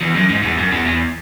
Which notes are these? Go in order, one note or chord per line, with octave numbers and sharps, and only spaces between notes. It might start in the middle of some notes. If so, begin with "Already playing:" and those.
E2
F#2
G#2
E2
F#2
E2
E2